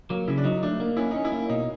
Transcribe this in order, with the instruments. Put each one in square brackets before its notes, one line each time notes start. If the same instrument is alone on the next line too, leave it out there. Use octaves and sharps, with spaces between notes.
[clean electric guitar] F#3 [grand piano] A#3
[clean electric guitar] C#3 [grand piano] E4
[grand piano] D4
[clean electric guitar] F#3 [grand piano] D#4
[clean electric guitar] A3 [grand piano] D4
[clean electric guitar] A#3
[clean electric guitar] C#4 [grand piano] E4
[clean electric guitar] C#4 [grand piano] D#4
[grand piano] E4
[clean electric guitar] A#3
[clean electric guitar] B2 [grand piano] D#4